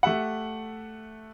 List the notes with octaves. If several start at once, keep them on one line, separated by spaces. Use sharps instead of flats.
A3 G4 E5 F#5